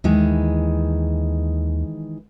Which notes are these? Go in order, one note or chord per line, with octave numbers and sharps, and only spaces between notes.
D#2 D#3 E3 G#3